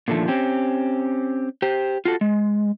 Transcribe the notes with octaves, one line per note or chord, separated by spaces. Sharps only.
A#2 D3 D#3 F3 A3
C4 C#4 G4
G4 C5
F4 F#4 A4
G#3